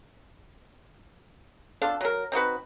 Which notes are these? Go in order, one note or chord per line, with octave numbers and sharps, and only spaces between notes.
B3 D4 F4 A4
F#3 A#4
C4 D#4 F#4 B4